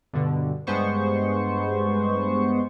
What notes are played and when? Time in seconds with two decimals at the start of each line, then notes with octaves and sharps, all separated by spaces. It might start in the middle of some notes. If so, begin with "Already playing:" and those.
0.13 G2 B2 D3
0.67 G2 G#3 B3 C5 C#6